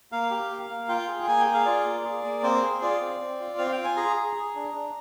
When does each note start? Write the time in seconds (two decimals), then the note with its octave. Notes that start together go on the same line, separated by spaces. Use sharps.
0.12 A#3 F5
0.31 G4
0.50 A#3
0.70 A#3
0.89 F4 G5
1.08 G#4
1.23 G5
1.27 A#3 G#5
1.40 G5
1.47 G#4
1.54 F5
1.65 F4 D5
1.85 A#3
2.04 G#4
2.24 A#3
2.43 C4 C5
2.62 G#4
2.82 F4 D5
3.01 C4
3.20 C4
3.40 F4
3.58 C4 F5
3.72 G5
3.78 F4
3.84 G#5
3.97 G#4 A#5
4.16 G#4
4.36 G#4
4.55 D4
4.75 D4